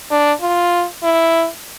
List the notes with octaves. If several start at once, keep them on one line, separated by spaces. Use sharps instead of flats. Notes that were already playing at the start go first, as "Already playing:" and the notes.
D4
F4
E4